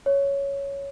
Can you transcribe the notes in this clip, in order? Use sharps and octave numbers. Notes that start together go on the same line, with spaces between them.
C#5